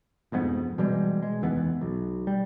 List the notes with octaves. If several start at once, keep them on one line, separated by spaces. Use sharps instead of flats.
E1 F2 G#2 B3
B2 E3 G3 G#3
G#3
F1 D#2 E3 B3
B1
G3